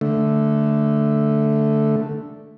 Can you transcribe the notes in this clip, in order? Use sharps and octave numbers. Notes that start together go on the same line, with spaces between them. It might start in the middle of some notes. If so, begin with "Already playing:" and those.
D3 A3